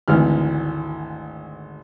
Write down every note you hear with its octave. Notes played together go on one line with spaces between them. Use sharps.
G#1 D2 E3 F6